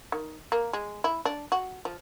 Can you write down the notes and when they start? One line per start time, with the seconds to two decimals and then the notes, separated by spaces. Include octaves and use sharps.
0.12 D#3
0.52 A#3
0.73 G#3
1.04 E4
1.25 D4
1.52 F#4
1.85 F3